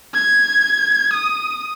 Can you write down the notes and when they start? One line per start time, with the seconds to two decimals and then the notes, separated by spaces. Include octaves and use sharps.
0.14 G#6
1.14 D#6